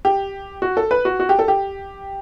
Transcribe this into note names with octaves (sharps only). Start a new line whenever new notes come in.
G4
F#4
A4
B4
F#4
F#4
G4
A4
G4